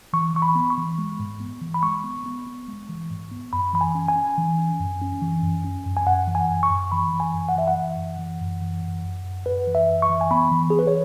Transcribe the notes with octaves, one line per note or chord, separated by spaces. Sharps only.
E3 C#6
E3 C#6
B5
B3
C#6
E3
G#3
G#2
B3
E3
B5
G#3 C#6
B3
B3
B3
G#3
E3
G#2
B3
F#2 B5
E3 B5
G#5
C#4
G#5
C#4
E3
C#4
F#2
C#4
E3
F#2
C#4
F#2
G#5
F#2 F#5
E3
G#5
F#2
C#6
F#2
E3 B5
E3
G#5
F#2
F#5
E3 E5
F#5
E3
F#2
E3
F#2
E3
F#2
F#2
F#2
F#2 B4
E3
E5
F#2
C#6
E3
G#5
B3 B5
E3
E3 G#4
B4
C#5